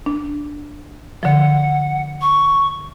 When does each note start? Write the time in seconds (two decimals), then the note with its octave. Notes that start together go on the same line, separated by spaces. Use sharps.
0.06 D4
1.23 D3 F3 F#5
2.21 C#6